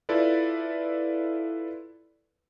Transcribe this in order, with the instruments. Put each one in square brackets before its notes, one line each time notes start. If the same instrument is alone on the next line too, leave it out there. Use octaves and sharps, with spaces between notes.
[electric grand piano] E4 F4 A4 B4 D5